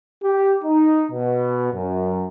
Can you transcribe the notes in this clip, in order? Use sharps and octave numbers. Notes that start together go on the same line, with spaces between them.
G4
D#4
B2
F#2